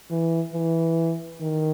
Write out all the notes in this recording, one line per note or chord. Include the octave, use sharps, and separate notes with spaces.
E3
E3
D#3